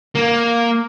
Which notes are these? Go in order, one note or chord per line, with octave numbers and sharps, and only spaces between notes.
A#3